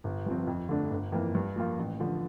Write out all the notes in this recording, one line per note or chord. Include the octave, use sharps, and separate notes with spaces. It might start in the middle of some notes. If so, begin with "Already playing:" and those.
G1
G2 F3 C4
F2
D3 A3 D4
G1
F2 E3 A#3
G2
F3 A#3 F4
A1
D3 F3